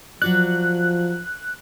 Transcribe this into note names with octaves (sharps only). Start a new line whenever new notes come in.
F3 F#3 F#4 D5 F#6